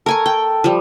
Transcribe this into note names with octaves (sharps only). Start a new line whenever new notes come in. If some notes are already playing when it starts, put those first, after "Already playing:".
A4 A#4 G#5 C#6
G5
F3 G3